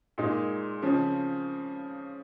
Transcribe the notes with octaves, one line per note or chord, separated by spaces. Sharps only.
A#2 G#3 D#4
C#3 F3 C4